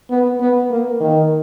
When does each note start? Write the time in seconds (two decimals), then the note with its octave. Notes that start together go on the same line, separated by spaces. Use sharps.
0.10 B3
0.41 B3
0.70 A#3
1.00 D#3